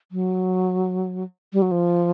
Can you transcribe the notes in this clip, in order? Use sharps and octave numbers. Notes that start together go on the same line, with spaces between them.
F#3
G3
F#3
F3